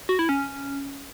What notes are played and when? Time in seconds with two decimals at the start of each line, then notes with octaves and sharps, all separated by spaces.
0.09 F#4
0.19 E4
0.29 C#4